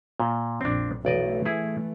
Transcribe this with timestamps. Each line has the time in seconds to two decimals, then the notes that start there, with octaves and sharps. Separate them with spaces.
0.20 A#2
0.61 A#1 F2 C4 D4
1.05 B1 E3 A3 D5 D#5
1.45 E4 G#4